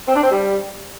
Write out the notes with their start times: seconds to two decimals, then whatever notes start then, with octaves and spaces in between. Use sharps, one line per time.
0.07 C4
0.15 D4
0.23 C4
0.31 G3